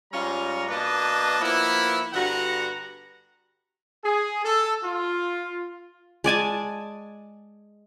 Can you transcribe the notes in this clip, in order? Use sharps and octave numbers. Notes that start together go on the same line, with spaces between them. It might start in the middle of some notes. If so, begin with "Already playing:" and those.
G#2 G3 C#4 F4 A#5
B2 A#3 D4 B4 D#5 A5
F3 A#3 B3 E4
G2 D3 B3 F#4 F#5 A#5
G#4
A4
F4
G#3 D5 G#5 A5